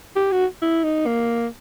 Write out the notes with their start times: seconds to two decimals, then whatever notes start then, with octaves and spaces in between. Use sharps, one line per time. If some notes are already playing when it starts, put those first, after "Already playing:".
0.16 G4
0.32 F#4
0.62 E4
0.84 D#4
1.06 A#3